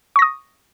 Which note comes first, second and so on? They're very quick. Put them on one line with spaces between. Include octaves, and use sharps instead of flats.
C#6 A#6 D#6